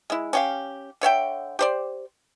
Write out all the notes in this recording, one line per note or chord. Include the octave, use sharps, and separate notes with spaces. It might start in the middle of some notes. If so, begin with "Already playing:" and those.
G#3 E4
C#4 G4 F5
D3 C#5 E5 G5
G4 C5 D5